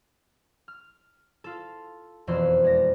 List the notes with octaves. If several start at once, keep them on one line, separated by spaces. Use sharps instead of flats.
F6
F4 A4
E1 F2 C5 E6
G#3 D5 A#6